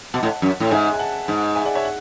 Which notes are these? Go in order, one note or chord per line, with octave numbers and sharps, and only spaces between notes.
B2 F#5 A5
A2
F#2
A2
G#2 E5 G#5
G#5
F#5 A5
G#2
E5 G#5
D5 F#5
C#5 E5
F#5